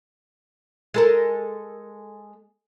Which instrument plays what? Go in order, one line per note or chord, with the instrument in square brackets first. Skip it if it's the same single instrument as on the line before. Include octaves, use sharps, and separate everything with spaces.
[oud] G#3 A4 A#4